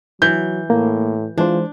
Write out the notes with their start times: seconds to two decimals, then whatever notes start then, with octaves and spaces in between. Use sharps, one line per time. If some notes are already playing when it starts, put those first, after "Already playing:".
0.22 E3 F#3 G6
0.70 A2 A#3
1.38 E3 G#3 D4 F4 C5